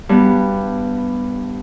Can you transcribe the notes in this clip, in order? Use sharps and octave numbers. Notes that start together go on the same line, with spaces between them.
G2 B3